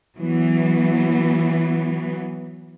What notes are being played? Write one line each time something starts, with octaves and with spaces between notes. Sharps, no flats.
E3 F#3 B3